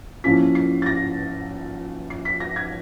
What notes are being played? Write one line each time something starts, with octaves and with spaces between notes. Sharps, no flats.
F3 A#3 C#4 E4 B6
C7
A6
A#6
C7
B6
A#6
G#6